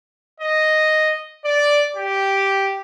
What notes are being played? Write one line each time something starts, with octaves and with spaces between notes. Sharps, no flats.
D#5
D5
G4